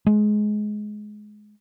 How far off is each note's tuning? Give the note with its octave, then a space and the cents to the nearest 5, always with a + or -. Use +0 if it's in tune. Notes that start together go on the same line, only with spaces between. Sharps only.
G#3 +20